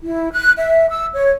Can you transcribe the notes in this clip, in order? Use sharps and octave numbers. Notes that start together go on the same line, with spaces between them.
E4
F#6
E5
E6
C#5